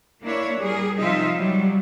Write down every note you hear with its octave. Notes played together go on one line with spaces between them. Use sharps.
A#3 D4 E4 C#5
G3 G#4 A#4
C3 F3 D#4 F4 E5
F#3 G3